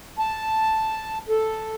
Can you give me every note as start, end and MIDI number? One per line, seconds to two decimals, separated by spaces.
0.19 1.18 81
1.29 1.75 69